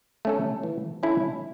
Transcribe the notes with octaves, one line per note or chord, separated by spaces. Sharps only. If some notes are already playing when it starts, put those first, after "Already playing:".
A3 C#4 A4
E3
C#4 E4 A4